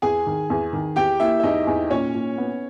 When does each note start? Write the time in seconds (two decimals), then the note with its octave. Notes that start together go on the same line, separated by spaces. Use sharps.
0.02 E2 G#4 G#5
0.27 D#3
0.50 E2
0.73 D#3
0.96 E2 G4 G5
1.20 A#3 E4 E5
1.40 E5
1.43 E2 D#4 D#5
1.67 E2
1.90 A#2 C#4 C#5
2.14 A#2
2.38 B3